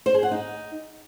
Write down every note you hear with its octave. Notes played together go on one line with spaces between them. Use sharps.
C5
G#4
F#5
D#4